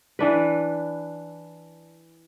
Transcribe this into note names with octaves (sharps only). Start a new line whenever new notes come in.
E3 D4 B4